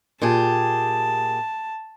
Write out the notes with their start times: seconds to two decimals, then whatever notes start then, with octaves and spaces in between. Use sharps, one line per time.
0.22 A#2 G4 G#4 A5